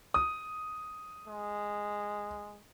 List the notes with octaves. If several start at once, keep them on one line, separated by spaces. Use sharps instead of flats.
D#6
G#3